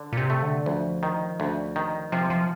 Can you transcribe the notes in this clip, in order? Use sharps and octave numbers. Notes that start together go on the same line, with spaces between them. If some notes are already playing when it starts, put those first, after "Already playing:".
Already playing: D3
A#2
C3
A3
D3
D2 F3
D#3
D2
D#3
C3 F3
F3